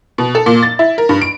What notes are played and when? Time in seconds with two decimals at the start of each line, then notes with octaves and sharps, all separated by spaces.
0.18 B2
0.35 A4
0.46 A#2
0.63 A6
0.79 E4
0.98 A#4
1.09 G2
1.22 D7